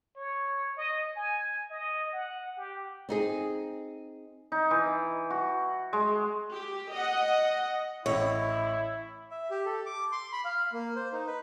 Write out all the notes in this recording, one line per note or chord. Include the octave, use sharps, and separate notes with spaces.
C#5
D#5
G#5
D#5
F#5
G4
C4 D#4 G#4
D#4
E3
F#4
G#3
G4
D#5 F#5
A1 A2 E4 C#5 D#5
E5
G4
A4
D6
C6
B5
F5
A#3
C5
D#4
B4